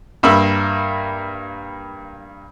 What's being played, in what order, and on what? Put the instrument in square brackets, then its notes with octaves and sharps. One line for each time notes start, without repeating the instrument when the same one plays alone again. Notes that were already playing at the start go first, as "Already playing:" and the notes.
[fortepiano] G2 A#3 E5 B5 E6